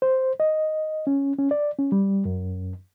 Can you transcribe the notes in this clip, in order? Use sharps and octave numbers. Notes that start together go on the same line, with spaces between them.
C5
D#5
C#4
C#4
D5
C#4
G3
F#2